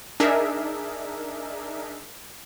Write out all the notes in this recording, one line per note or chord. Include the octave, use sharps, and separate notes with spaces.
D4 D#4 G#4 A#4 E5